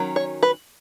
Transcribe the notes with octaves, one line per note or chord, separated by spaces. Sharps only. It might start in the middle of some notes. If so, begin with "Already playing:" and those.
Already playing: D#3 F#3 C#4
C#5
B4